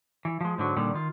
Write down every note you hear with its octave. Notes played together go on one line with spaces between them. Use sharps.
E3
F3 G#3
G#2 D3 F#3
A#2 D3 D#3 G3
D#3 F4